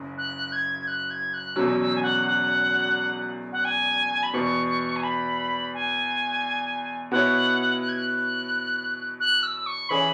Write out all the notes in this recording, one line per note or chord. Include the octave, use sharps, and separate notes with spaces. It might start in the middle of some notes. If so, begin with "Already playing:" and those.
Already playing: F#1 F#2 C#3
F#6
G#6
G#6
F#6
G#6
F#6
E1 E2 B2 F#3 C#4 E6
E6
G#5
F#5
F#5
F#5
G#5
B5
E2 B2 B3 C#6
G#5
B5
G#5
B2 B3 E4 C#5 F#5
F#6
G#6
F#6
F#6
E6
E6
C#6
E3 C#4 G#4 C#5 B5